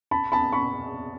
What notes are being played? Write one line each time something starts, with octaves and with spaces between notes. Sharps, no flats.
A5 B5
A5 B5
B5 C#6